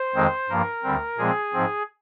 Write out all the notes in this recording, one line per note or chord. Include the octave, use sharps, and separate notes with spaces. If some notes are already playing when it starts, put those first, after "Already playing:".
Already playing: C5
F2 D#3 G#3 C4
G2 F3 A#3 A#4
D2 D3 G3 C4
A#2 F3 G#3 C4 G#4
G#2 F3 C4